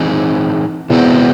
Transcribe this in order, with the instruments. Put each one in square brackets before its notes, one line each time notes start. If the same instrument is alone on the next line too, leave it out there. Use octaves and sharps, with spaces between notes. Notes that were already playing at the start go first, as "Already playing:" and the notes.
Already playing: [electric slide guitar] E3 C4 D#4 G#4
[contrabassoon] E2 [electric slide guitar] C3 E3 G#3 C4 F#4